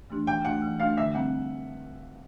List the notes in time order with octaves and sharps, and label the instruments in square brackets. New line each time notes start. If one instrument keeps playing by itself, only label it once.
[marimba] E3 A3 D4 G4
[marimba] E3 [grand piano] G5
[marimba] A3 D4 F#4 [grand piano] F#5
[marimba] E3
[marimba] A3 D4 F#4 [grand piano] F5
[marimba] D3 [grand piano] E5
[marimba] G3 C4 [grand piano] F#5